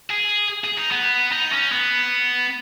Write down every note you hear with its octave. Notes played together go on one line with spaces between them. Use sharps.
G#4
G#4
D#4
B3
D#4
C#4
B3